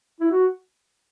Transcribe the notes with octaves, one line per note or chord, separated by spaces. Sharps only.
E4
F#4